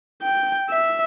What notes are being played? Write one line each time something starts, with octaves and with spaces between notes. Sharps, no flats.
G5
E5